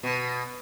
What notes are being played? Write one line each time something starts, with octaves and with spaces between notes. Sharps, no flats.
B2